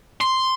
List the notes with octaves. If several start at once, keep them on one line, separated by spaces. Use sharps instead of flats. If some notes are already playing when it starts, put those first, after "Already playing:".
C6